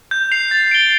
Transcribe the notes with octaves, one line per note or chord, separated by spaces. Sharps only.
G6
C7 F7
A6
D7 G7